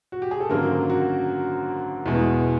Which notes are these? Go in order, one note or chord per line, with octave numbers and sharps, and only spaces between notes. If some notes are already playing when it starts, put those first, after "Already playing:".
F#4
G4
G#4
A4
G#1 F#2 D3 F#3 A#3 A#4
F#4
E2 B2 G#3